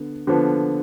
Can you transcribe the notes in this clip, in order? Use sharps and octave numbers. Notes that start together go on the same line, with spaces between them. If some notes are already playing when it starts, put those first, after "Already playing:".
Already playing: D3 B3
D3 F3 B3